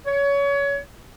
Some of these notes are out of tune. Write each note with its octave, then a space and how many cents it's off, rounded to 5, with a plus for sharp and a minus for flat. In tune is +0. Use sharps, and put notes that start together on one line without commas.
C#5 +25